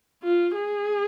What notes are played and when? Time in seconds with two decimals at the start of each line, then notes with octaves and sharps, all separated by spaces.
0.23 F4
0.55 G#4